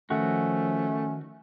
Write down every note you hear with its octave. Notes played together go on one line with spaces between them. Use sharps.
D#3 F3 A3 C#4 F#4